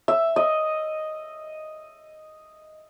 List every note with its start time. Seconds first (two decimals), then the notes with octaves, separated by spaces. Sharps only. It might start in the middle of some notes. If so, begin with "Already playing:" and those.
0.08 E5
0.36 D#5